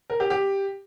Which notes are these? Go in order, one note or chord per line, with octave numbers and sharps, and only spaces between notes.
A#4
G4
G4